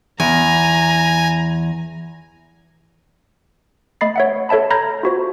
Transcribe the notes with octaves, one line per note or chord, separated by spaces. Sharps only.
E2 G#5 A#5
A3 D#5 B5 A6 C7
C#5 E5 F#5
A4 C#5 E5 A5 B5
A#5 B5 F6 G6 G#6 A#6
F4 F#4 C5